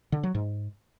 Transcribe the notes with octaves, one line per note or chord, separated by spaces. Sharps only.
D3
F#3
G#2